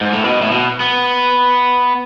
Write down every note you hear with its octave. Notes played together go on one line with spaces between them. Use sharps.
G#2
A2
B2
A2
B2
B3